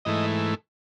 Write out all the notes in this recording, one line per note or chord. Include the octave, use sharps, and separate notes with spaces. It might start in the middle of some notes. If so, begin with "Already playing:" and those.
G#2 E3 A3 D#5